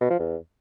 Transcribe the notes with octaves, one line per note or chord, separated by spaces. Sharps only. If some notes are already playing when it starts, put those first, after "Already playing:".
B2
F3
E2